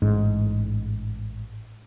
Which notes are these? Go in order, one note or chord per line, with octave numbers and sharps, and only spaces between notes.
A1 G#2